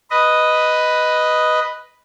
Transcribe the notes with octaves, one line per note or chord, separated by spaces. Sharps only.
B4 D#5